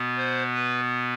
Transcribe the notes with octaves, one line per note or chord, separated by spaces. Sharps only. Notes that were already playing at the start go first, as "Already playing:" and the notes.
Already playing: B2 B3
C5
B4